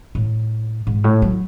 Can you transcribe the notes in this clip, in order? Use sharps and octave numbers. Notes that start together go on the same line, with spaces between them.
A2
G#2
A2
F#3